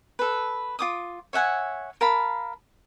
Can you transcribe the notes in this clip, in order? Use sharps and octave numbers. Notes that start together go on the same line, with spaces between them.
A4 B4
F4 D6 D#6
C#5 E5 F#5 G#5
A#4 F5 A5 B5